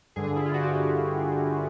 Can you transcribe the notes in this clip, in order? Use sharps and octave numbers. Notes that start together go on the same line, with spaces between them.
G2 D3 G#4
E4
F4
F#4
G4